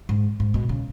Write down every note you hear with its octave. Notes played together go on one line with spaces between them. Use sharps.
G#2
G#2
B2
C#3